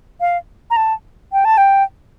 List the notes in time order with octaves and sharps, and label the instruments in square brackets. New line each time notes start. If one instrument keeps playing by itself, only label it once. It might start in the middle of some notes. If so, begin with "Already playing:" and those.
[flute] F5
A#5
A5
G5
A5
G5